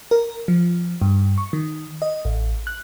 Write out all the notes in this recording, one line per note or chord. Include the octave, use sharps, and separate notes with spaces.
A#4
F3
G2
C#6
D#3
D#5
A1
F#6